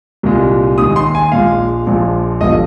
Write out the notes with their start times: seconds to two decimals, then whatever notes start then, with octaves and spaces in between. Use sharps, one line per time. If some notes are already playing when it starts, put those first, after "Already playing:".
0.23 C2 A#2 G#3
0.78 D#2 D#3 G#3 D#6
0.96 C6
1.15 G#5
1.32 A#1 A#2 G#3 F5
1.87 A#1 A#2 F3 G#3
2.41 G1 G2 F3 D#5